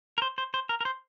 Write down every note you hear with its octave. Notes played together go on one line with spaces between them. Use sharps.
A#4
C5
C5
C5
A#4
A#4
C5